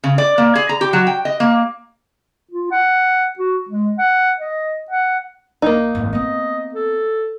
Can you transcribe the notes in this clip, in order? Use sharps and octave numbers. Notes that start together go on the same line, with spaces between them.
C#3
D5
A#3
G#4
A#5
G4
F#3
G5
D#5
A#3
F4
F#5
F#4
G#3
F#5
D#5
F#5
A#1 A#3 D#4
G#1 F#2
B3 C4 D#5
A4